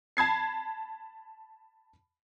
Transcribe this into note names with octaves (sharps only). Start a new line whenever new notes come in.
A5 B5 G#6 C7